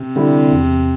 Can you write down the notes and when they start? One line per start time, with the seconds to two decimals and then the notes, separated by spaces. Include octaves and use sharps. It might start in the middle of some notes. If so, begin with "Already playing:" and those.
Already playing: C3
0.16 D3 G3 E4
0.52 E2